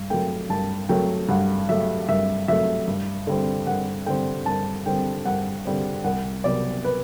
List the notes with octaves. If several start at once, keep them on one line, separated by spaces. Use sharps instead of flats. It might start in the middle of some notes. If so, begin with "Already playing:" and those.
Already playing: G2
F#3 A3 G5
G2 A5
F#3 A3 G5
G2 F#5
F#3 A3 E5
G2 E5
F#3 A3 E5
G2
D3 G3 C4
G2 F#5
D3 G3 C4 G5
G2 A5
D3 G3 C4 G5
G2 F#5
D3 G3 C4
C2 F#5
C3 F#3 B3 D5
B4